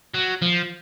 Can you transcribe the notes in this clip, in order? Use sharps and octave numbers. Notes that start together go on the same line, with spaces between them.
F#3
F3